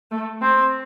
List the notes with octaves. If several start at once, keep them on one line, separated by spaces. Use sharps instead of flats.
A3
C4